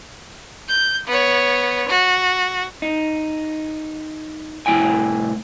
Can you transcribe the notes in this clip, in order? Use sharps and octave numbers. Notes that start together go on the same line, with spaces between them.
G6
B3 C#5
F#4
D#4
C2 A2 G#3 E4 G5 G#5